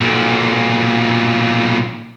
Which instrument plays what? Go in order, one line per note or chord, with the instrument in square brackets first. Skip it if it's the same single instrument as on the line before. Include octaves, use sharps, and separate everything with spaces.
[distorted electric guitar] B1 A#2